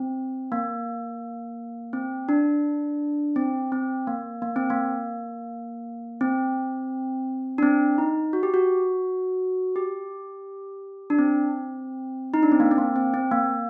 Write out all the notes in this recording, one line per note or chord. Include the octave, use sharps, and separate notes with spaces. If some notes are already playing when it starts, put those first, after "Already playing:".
Already playing: C4
A#3
C4
D4
C4
C4
A#3
A#3
C4
A#3
C4
D4
C4
D#4
F#4
G4
F#4
G4
D4
C4
D#4
D4
C4
A#3
C4
A#3
C4
C4
A#3